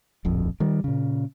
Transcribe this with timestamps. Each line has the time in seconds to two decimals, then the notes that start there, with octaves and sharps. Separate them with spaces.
0.25 D1 A#1 F2
0.60 D#3 G3
0.84 A#2 C#3